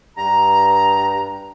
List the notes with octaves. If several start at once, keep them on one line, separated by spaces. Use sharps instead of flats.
G2 A#5